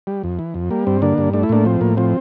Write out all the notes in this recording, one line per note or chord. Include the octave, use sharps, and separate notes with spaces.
G3
F2
E3
F2
G3 A#3
G2 C4
D3 A#3 D4
G2
A3 D4
E4
A2 A#3 D4
F3 C4
A2 A#3
F3 C4